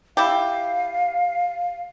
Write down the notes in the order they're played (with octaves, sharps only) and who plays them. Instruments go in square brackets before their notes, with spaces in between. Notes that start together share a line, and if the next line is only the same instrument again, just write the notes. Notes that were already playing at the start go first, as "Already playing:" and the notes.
[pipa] E4 G4 [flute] F5